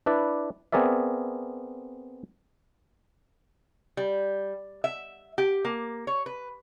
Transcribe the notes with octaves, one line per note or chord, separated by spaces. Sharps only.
D4 E4 B4 D5
B3 C4 G#4 A#4 D5 E5
G3
E5
G4
A#3
C#5
B4